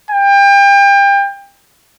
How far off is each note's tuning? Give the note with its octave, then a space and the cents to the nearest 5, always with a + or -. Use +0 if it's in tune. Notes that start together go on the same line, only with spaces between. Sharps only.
G5 +30